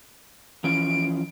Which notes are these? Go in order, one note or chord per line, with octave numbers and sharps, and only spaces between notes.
E3 F3 C#4 D7